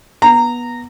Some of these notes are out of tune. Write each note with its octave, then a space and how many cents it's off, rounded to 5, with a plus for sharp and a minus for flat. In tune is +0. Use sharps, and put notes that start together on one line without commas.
B3 -20 A#5 -15